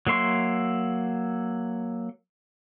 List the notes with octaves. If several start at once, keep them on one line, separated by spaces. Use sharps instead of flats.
F#3 A#3 E5 C6 C#6